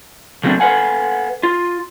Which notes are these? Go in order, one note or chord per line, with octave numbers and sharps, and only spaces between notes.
C#3 F#3 A3 B3 C4 D4
A4 B4 C#5 F5 F#5 G#5
F4